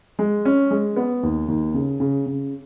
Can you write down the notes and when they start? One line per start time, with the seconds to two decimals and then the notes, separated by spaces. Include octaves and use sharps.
0.19 G#3
0.45 C#4
0.71 G#3
0.96 B3
1.23 D#2
1.48 D#2
1.74 C#3
2.00 C#3
2.26 C#3